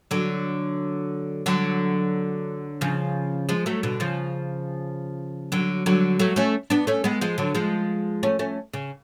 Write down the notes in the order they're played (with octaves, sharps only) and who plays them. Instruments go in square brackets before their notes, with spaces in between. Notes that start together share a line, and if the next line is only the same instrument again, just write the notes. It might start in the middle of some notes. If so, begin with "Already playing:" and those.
[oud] D3 F#3
D3 F#3
C#3 F3
F3 G#3
F#3 A3
B2 D3
C#3 F3
D3 F#3
D3 F#3
F#3 A3
A3 C#4
B3 D4
A3 C#4
G#3 B3
F3 G#3
D3 F#3
F3 G#3
A3 C#4
A3 C#4
C#3